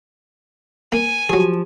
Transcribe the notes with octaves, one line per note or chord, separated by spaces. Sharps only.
A#3 G#5
F3 F#3 G4 G#4 A5